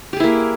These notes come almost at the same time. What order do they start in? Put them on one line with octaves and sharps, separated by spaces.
G4 G#4 E4 A#3